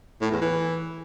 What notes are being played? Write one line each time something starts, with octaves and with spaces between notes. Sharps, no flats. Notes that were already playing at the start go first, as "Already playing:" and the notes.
A2
E2
E3